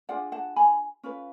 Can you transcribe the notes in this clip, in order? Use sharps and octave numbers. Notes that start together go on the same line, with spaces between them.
D4 F4 G#4 D5 F#5
F#5 A5
G#5 B5
C#4 F4 B4